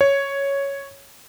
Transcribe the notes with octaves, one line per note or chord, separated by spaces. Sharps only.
C#5